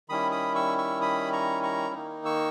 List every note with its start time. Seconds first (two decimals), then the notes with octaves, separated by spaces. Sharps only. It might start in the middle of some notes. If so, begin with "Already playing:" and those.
0.09 D#3 G3 C#4 E4 B5 D#6
0.32 B5 D#6
0.55 C#6 E6
0.78 C#6 E6
1.01 B5 D#6
1.32 A#5 C#6
1.63 A#5 C#6
1.94 D#3 A#3 D#4
2.25 C#6 E6